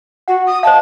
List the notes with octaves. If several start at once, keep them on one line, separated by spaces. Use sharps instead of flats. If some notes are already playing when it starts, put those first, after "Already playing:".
F#4 F#5
D#6
C5 D#5 F5 A5